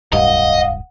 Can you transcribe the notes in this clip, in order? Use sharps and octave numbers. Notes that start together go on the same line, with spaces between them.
D1 C2 G2 D#5 F5 F#5